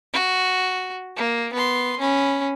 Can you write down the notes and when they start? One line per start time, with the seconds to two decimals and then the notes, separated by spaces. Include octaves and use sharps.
0.14 F#4
1.16 A#3
1.53 B3 C6
2.00 C#4 B5